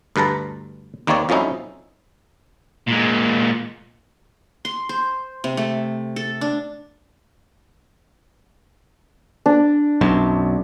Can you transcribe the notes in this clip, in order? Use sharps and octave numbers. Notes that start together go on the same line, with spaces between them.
D2 G2 B4 A5 A#5
D#2 D#3 A#3 C4 C#5 D5
F2 F3 F#3 C#4 D#4 E4
A#2 G#3
C6
C5
C3
A3
A4
D4
D4
B1 F#2